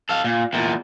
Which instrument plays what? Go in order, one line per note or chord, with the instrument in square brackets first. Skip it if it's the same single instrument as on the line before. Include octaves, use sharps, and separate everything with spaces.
[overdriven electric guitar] A4 F5
A#2
E2 A#2